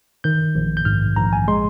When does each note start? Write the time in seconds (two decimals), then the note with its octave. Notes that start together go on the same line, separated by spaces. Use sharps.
0.24 D#3 G6
0.55 A#1
0.77 G6
0.85 G#2 F6
1.16 A#1 A#5
1.33 G#5
1.48 G#3 C6